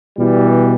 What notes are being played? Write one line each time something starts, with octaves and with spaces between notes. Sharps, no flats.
B2 E3 G3